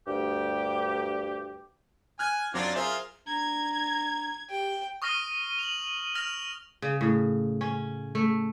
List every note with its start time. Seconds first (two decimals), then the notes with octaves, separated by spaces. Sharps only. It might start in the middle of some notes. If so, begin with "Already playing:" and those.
0.07 D2 G2 G4
2.19 G#5 F6 F#6 G#6
2.54 F#2 F#3 C4 D4 F4 D5
2.75 F4 G#4 A#4 C5 E5
3.27 D4 A#5 G#6
4.50 G4 G5
5.02 C#6 D#6 F6 A#6 D#7 G7
5.59 F7 F#7
6.15 F6 A#6 F7
6.82 C#3
7.01 A2
7.61 C#4
8.15 A3